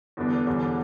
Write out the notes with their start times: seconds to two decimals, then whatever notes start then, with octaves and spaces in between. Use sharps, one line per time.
0.17 E2 D3 G3 B3 D4
0.47 E1 E2 D3 G3 D4